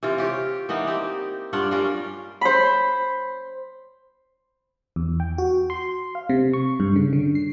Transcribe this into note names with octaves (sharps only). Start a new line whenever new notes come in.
C3 E3 F4
F4 G4 C#5
E3 A#3 B3 D#4
C4 D#4 G4
G2 D4 F4 F#5
G3 C#4 F4 A#4
C5 B5
E2
G5
F#4
C6
F5
C3
C#6
G2
C#3
D3
C7